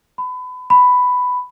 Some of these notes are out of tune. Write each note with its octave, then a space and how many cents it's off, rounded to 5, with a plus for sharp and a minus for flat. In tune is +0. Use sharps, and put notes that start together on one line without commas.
B5 +30
B5 +10